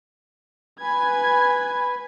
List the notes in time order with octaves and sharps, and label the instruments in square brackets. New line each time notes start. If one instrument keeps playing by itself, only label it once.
[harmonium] B4 [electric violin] G#5 G#6